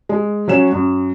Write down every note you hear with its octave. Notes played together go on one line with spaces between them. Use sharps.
G#3
F#3 C#4 E7
F#2